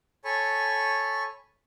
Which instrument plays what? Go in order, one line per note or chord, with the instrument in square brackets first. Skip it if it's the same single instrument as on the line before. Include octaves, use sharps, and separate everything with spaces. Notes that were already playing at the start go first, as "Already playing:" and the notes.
[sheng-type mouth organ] A4 C#5 G#5 B5 C#6